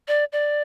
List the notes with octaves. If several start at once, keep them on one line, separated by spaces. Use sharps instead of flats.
D5
D5